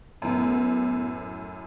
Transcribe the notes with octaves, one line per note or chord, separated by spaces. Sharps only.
F#2 A2 B3